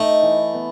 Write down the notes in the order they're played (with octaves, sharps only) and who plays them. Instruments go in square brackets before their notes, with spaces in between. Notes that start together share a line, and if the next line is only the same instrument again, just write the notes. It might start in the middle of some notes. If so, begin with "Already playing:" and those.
Already playing: [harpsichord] A3 [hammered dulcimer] D#4
[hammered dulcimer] E3
B3